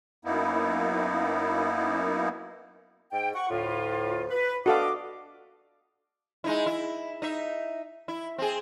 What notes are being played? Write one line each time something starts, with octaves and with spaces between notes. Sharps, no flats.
F#2 A#3 B3 D#4 E4
G#2 G5
F#5 C#6
D2 A2 F4
B4
D4 F#4 A4 D#5 F5 D6
G#3 D#4 E4
E4
D#4 E5
E4
C4 G#4